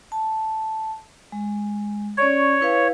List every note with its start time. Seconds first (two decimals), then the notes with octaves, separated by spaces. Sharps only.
0.12 A5
1.32 G#3
2.17 C#4 C#5 D5 C#6
2.61 E4 B4 F5